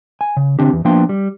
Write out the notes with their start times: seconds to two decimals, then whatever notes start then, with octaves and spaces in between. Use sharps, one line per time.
0.21 G#5
0.37 C#3
0.59 D3 C4 D4 G4
0.73 E2
0.85 F3 A#3 B3 D4 G5 C6
1.09 G3